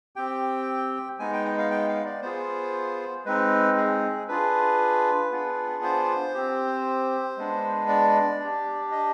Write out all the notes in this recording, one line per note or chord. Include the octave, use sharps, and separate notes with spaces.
C4 G4 G5
G#3 B3 D#4 G#5
G5
D#5
F5
G5
F5
D5
B3 F4 G#4 C5
G#3 C4 D#4 B4
G#4
D4 F4 G#4 B4
B3 D4 F4 G#4
C5
C4 G4
G#3 B3 D4
D5
D4 G4
D#5